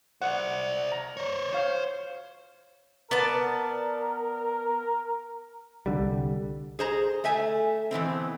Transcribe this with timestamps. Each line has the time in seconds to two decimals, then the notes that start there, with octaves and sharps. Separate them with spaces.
0.22 C5 D5 F#5
0.92 A#5
1.17 C5 C#5
1.53 C5 C#5 F5
3.11 B3 A#4 D5 A5
5.86 C2 D3 G3
6.79 G#4 C5 A#5
7.24 A3 E5 G#5
7.91 B2 E3 B3 C4